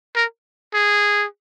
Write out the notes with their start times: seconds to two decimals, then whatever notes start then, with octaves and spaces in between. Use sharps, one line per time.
0.16 A#4
0.74 G#4